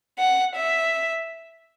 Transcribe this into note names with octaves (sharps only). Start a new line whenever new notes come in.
F#5
E5